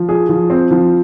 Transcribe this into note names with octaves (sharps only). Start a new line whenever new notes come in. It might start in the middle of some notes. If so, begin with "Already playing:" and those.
Already playing: F3
G#4
F3
C4
F3